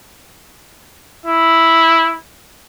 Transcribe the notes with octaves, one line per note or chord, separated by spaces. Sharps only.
E4